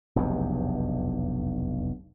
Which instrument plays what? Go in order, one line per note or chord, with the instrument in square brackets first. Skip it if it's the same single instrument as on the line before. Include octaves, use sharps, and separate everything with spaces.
[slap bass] F1 B1 E2 G2